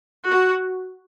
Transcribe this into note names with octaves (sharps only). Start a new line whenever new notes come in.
F#4